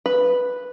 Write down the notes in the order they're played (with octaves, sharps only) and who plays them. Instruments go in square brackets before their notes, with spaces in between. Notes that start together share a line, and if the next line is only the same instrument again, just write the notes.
[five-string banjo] B4